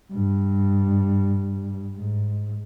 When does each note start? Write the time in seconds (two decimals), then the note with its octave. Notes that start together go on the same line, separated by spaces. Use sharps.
0.13 G2
1.95 G#2